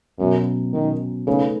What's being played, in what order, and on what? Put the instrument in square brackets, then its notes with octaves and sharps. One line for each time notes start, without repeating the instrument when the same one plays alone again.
[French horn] F#2 [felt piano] B2 F#3 C#4
[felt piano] B2 F#3 C#4 [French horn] D#3
[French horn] C#3 [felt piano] A3 D#4 G#4 B4